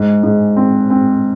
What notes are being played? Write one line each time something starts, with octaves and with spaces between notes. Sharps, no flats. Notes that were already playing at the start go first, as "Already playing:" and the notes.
Already playing: G#2
G#2
C4
C4